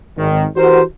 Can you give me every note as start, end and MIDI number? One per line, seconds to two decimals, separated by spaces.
0.17 0.44 32
0.17 0.44 51
0.56 0.82 52
0.56 0.82 66
0.56 0.82 67
0.56 0.82 70
0.56 0.82 72